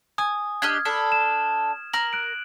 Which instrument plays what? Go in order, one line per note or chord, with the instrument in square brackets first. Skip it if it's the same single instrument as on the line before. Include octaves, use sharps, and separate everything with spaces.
[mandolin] G#5 [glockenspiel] D#6
[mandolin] D4 G4 D#5 [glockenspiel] F6 G#6
[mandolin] D4 A4 B5
[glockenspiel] E7
[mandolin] A#4 F6 [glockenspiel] F#7
[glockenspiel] F#6 D7